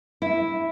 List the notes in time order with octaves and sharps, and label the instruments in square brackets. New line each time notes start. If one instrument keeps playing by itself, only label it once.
[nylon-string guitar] E4